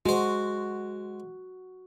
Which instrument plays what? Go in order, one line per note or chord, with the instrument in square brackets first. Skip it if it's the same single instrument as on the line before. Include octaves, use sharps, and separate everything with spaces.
[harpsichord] G#3 C5 [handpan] F#4